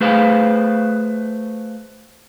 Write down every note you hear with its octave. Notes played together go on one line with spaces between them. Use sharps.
A3 G#4 B4 C5 F5